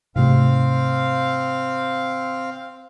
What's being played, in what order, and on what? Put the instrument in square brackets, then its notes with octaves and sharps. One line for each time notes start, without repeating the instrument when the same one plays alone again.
[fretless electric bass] G#2 C3 A3 [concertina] C4 F5